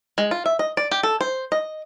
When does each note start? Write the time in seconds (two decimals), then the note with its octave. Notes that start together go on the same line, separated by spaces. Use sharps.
0.18 G#3
0.31 F4
0.46 E5
0.59 D#5
0.77 D5
0.91 G4
1.03 A4
1.21 C5
1.52 D#5